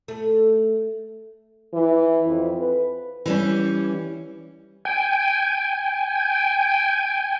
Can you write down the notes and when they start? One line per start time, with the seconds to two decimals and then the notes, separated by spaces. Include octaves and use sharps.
0.08 A3
1.74 E3
2.27 F2
2.59 B4
3.26 E3 G3 C#4
4.85 G5 G#5